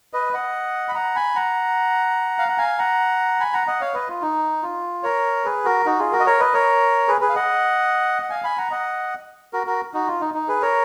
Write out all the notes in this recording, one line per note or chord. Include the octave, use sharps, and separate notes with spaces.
B4 D#5
D#5 F#5
B5
F#5 A#5
G#5 B5
F#5 A#5
F5
F#5
F5 G#5
F#5 A#5
G#5 B5
F#5 A#5
D#5 F#5
C#5 F5
B4 D#5
F4
D#4
F4
A#4 C#5
G#4 B4
F#4 A#4
D#4 F#4
F4 G#4
F#4 A#4
D#5
A#4 C#5
B4 D#5
A#4 C#5
G#4 B4
G#4 B4
F5
D#5 F#5
F#5
F5 G#5
G#5 B5
F#5 A#5
D#5 F#5
F#4 A#4
F#4 A#4
D#4 F#4
F4
D#4
D#4
G#4 B4
A#4 C#5